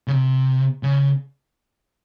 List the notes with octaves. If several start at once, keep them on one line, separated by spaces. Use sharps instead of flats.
C#3
C3
C#3